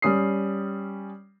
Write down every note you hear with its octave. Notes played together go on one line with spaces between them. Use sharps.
G3 C#4 D#6 C7